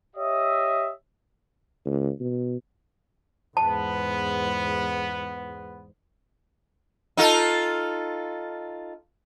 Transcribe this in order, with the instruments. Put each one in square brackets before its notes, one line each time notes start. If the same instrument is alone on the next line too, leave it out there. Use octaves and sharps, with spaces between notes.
[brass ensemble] G4 C#5 D#5 E5
[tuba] C#2
B2
[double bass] E2 G#2 [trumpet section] B3 [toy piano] A5
[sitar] D#4 F4 A4